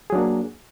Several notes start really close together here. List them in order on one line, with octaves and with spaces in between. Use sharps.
G#4 F#3 D4 A#3